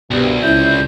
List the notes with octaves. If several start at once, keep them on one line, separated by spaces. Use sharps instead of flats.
C2 G2 B2
C#2 E4 G6